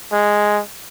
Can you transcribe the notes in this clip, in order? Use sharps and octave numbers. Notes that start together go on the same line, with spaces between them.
G#3